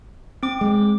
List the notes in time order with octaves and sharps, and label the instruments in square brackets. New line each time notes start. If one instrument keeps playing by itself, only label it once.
[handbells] C4 D6
[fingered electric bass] G#3